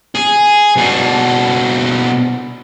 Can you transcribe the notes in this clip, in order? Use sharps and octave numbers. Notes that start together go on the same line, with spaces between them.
G#4
B2 D4